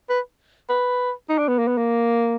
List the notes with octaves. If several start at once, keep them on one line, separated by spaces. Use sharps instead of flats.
B4
B4
D#4
D4
B3
A#3
B3
A#3